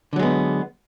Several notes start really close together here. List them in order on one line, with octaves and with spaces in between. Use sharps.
D3 F#3 G#3 B3